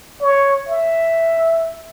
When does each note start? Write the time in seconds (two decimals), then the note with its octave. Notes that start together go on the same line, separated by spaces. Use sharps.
0.22 C#5
0.69 E5